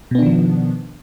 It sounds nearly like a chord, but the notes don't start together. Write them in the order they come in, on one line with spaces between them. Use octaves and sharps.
B2 B3 D4 D#3 F3